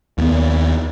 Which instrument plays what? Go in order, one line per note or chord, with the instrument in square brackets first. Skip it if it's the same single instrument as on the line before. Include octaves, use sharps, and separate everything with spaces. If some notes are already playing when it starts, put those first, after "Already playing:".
[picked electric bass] D#2 B3